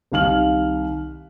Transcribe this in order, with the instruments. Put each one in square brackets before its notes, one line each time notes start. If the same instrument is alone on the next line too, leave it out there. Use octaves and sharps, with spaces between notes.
[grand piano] C2 D#3 F5 F6 F#7